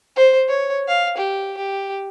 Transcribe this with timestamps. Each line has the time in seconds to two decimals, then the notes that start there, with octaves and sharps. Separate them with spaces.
0.16 C5
0.48 C#5
0.88 F5
1.17 G4
1.57 G4